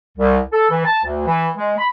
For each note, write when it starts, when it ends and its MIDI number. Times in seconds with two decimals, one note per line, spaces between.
0.18 0.39 36
0.52 0.68 69
0.70 0.80 52
0.85 1.01 81
1.04 1.24 38
1.26 1.49 52
1.56 1.74 56
1.78 1.87 83